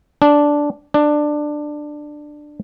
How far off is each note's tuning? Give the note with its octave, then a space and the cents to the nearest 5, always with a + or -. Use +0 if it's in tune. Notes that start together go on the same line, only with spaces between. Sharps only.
D4 -5
D4 +15